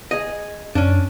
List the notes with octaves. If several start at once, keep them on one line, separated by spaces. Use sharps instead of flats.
G#4 D#5
F#2 C#4 D4